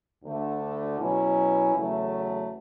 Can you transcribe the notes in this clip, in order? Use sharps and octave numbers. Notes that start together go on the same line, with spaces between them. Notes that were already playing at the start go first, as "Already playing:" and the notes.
D2 D3 A3
B2 F#3 C#4 E4
E2 C#3 F#3 A3